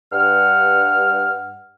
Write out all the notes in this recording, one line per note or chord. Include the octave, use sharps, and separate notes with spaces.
G2 F#5 F6